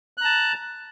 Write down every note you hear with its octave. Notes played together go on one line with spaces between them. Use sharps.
A5 A#5 F#6